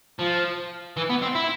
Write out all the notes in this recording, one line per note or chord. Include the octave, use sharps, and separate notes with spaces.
F3
E3
B3
C4
E4